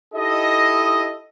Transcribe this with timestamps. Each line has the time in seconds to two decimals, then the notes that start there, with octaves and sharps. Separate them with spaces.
0.15 D#4 E4 G4 A4 D#5